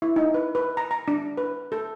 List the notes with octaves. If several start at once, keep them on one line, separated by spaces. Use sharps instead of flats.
E4
D#4
B4
B4
A#5
A#5
D4
B4
A4